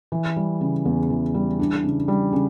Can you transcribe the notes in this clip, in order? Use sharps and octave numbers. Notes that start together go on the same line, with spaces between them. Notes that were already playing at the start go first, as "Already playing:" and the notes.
E3
G3
C#3
E2
E3
G3
D4
C#3
G3
C#3